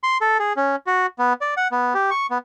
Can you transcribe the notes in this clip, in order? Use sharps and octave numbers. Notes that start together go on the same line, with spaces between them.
C6
A4
G#4
C#4
F#4
B3
D5
F#5
B3
G4
C#6
B3